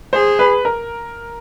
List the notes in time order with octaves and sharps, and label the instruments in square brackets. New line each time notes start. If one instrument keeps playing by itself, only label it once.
[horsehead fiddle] G#4 [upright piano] C5
[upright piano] B4
A#4